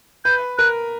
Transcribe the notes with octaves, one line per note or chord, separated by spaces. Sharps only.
B4 G6
A#4 F#6